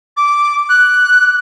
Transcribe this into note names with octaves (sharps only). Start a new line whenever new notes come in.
D6
F#6